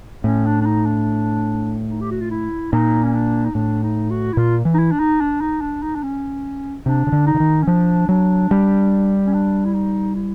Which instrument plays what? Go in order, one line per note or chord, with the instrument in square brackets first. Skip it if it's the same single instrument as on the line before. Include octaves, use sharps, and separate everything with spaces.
[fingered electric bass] A2 [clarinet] C#4
[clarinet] D4
D4
D#4
D4
D#4
G4
F#4
F4
E4
[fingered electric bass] A#2 [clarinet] D#4
[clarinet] C#4
D4
D#4
[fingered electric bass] A2 [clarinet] D4
[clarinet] D#4
F#4
E4
[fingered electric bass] A#2 [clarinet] F4
[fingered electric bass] E3
[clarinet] D#4
E4
D4
D#4
D4
D#4
D4
D#4
D4
C#4
[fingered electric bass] C3 [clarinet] D4
[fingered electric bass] C#3
D3
[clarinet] D#4
[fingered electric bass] D3
D#3
[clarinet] C#4
[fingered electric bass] F3 [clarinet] D4
[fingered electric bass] F#3 [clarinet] D4
[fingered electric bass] G3
[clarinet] C#4
D4
E4
D#4
E4